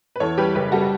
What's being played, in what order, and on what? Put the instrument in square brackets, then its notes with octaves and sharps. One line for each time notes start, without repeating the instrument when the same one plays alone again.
[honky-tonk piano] B4
[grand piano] E2 [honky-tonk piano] A4 C#5
[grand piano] G3 [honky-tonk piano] G4 B4
[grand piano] F#1 [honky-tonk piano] G4 B4
[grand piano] G3 [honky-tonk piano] F#4 A4